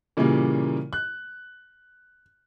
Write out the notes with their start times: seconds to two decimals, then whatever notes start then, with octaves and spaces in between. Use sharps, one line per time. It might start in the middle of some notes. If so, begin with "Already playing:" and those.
0.17 A#2 C#3 E3 G3 A#3
0.93 F#6